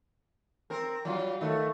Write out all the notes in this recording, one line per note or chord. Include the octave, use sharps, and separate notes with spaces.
C4 A#4
F#3 G3 F4
D#3 A3